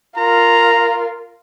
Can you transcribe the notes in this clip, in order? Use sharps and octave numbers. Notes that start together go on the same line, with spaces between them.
F4 A#4 A#5